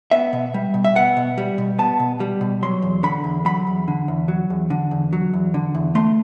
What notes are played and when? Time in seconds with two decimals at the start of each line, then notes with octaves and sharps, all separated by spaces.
0.11 B3 E5
0.33 B2
0.54 G3
0.74 B2
0.84 E5
0.95 B3 F#5
1.17 B2
1.38 G3
1.58 B2
1.78 B3 A5
2.00 B2
2.20 G3
2.41 B2
2.63 F#3 C6
2.82 E2
3.03 D3 B5
3.24 E2
3.45 F#3 B5
3.67 E2
3.88 D3
4.08 E2
4.28 F#3
4.50 E2
4.70 D3
4.91 E2
5.13 F#3
5.33 E2
5.54 D3
5.75 E2
5.95 A3 C6